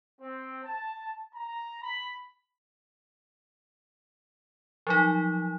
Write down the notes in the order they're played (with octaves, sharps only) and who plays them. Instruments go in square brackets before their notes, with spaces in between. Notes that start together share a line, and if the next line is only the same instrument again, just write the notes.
[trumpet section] C4
A5
A#5
B5
[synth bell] F3 F#3 D#4